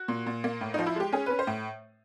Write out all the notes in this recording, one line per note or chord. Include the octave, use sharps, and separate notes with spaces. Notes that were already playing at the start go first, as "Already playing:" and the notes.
Already playing: F#4
A#2
A#2
A#3
A2
D#4
F3
E4
G#3 G4
C#4 G#4
B4
C#4
C5
A2